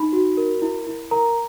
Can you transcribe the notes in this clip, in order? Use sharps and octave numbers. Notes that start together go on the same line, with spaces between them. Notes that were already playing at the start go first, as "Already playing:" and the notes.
Already playing: D#4 B5
F#4
A#4
E4
E4
A#4 A#5